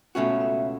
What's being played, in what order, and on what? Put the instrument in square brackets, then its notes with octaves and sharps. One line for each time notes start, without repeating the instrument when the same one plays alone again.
[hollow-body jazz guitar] C#2 B2 A3 C#4 F#4 [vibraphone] E5
[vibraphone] E5